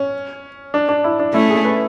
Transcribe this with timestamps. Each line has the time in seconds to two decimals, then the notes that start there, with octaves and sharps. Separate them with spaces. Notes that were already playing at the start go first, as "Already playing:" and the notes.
Already playing: C#4
0.74 D4
0.89 D4
1.04 E4
1.19 D4
1.34 A3 C#4 E4
1.50 G#4
1.64 B4